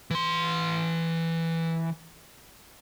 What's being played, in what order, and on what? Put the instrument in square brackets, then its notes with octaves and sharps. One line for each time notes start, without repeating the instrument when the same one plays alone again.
[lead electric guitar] E3 C6